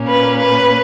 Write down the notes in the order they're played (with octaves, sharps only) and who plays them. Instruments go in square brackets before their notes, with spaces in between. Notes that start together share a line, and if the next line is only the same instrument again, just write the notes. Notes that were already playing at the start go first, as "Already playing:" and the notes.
Already playing: [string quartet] A#2 A#3 C#4
B4
B4